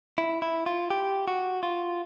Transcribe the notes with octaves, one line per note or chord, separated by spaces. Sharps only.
E4
E4
F4
G4
F#4
F4